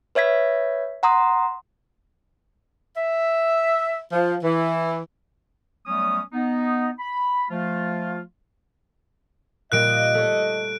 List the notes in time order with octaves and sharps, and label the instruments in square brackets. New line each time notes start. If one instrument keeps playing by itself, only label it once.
[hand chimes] B4 C#5 E5 G#6 B6
F#5 A#5 C6 D#6
[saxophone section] E5
F3
E3
[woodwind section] F#3 G3 A3 B3 C#4 D#6
B3 D#4
B5
F3 A3 F4
[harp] A#2 G3 A#3 [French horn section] D#5 [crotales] F#6 D7
[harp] A3 C#5